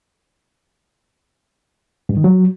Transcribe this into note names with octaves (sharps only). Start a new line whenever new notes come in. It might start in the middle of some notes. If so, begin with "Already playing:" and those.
G2
D#3
F#3